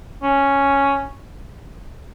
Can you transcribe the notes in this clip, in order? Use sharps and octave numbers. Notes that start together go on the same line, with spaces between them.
C#4